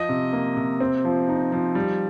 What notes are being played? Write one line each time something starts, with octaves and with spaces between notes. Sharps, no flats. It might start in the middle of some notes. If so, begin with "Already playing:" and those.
Already playing: F3 D#5
C3
A#3
C3
C4
F3
D#4
F3
G3